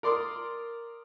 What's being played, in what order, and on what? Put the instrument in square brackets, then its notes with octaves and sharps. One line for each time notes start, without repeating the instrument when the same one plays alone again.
[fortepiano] A#4 D5 C6 D6 D#6